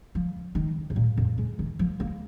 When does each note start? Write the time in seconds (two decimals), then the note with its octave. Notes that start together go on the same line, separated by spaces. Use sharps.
0.15 F3
0.55 D#3
0.90 G#2
0.96 A#2
1.17 F2
1.38 G#3
1.59 D#3
1.79 F3
2.00 A#3